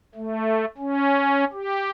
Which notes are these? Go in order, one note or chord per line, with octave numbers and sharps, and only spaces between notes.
A3
C#4
G4